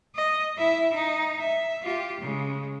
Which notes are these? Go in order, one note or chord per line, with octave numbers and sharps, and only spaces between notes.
D#5
E4 E5
D#4
E5
F4 G4
C#3 G#3